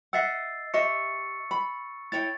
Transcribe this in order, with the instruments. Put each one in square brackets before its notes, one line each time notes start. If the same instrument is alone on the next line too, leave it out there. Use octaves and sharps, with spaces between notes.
[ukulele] D#5 E5 F#5 [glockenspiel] E6 A6 C7
[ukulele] G4 D#5 E5 [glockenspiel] C#6 C#7
[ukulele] B5
[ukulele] E4 C#5 G5 [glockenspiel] A6